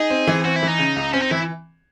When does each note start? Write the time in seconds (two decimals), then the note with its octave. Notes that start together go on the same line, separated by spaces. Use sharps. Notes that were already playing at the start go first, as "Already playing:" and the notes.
Already playing: D#4 G#4
0.10 C4
0.27 E3
0.45 C4 F#4
0.56 E4
0.63 E3 D#4
0.79 C#3
0.96 C#2
1.13 C4 C#4
1.22 D#4
1.31 E3 E4